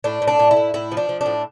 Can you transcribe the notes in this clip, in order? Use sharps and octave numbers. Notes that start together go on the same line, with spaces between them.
A2 D4
A2
D4
A2
E4
A2
A2 E4
F3
D4
F3
D4
A2